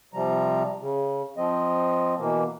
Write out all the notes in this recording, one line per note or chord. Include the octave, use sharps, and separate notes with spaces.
C3 F3 G3 A#5
C#3
F3 C4 D#5
B2 E3 A#3